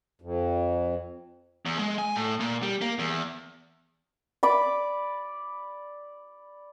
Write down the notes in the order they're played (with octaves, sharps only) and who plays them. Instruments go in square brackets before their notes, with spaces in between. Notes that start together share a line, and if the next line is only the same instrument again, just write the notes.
[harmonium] F2
[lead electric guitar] E2
G#3
G#5
A2
A#2
G3
A#3
E2
[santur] D5 B5 D6